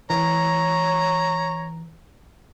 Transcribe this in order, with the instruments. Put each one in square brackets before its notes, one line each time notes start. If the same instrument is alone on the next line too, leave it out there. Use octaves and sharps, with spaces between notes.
[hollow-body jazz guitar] E3 [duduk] C#5 [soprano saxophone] A#5